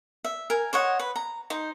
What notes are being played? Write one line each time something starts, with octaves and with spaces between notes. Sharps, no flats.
E5
A#4 G#5
C5 C#5 D#5 F#5
B4
A#5
D#4 C5